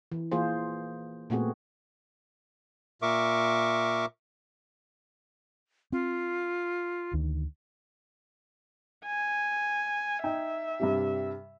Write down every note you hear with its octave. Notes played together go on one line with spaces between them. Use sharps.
E3
E3 A#3 F4 G#4 C5
A#2 A3 B3 C4 F#4 G#4
A#2 A#4 E5 C#6 D6
C4 F4
D2 D3 D#3
G#5
D#4 E5 G5
G2 C3 G3